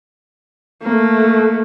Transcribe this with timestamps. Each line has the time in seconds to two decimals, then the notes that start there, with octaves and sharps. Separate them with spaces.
0.83 A3 A#3